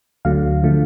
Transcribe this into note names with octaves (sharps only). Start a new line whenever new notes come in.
D2 D3 F#3 A3 F5
D3 F3 A3